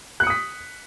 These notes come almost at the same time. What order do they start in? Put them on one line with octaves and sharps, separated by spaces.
F#6 C#7 D#6 B6